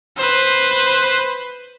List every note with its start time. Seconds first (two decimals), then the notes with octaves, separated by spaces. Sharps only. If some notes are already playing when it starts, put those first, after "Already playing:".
0.17 B4 C5